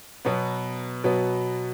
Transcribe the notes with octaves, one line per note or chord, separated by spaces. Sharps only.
B2 F#3 B3
B2 F#3 B3